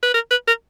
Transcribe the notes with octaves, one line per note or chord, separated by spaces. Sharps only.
B4
A#4
B4
A#4